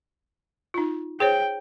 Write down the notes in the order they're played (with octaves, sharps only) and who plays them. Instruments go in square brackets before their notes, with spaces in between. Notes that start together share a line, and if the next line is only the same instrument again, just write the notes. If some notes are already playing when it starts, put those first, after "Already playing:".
[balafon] D#4 F4
[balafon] G#4 C5 C#5 [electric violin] G5